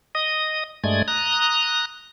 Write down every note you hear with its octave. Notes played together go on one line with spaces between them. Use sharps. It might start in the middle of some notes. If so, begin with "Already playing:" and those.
D#5 D#6
G2 G#3 A3 D5 D#6 G#6
A#5 D#6 F#6